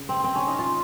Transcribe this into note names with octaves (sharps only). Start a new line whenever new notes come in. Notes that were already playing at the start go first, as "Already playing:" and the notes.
Already playing: C#3
C4
C4
C#4
D#4
F4